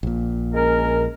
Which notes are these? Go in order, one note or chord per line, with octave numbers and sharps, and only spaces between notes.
A#1 A#2
G#3 C#4 A#4